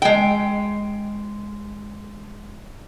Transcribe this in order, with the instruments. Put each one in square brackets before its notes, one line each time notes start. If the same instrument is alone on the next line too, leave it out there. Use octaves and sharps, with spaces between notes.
[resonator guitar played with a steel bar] G#3 G5